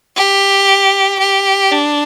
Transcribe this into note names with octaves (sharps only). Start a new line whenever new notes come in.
G4
G4
D4